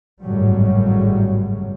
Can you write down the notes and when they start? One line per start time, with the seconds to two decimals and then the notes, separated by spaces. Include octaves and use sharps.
0.22 G#1 F#2 A2 C#3 F#3 G3